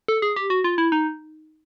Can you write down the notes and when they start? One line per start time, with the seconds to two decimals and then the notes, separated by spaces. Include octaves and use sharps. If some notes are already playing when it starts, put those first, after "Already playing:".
0.08 A4
0.22 G#4
0.36 G4
0.50 F#4
0.64 F4
0.78 E4
0.92 D#4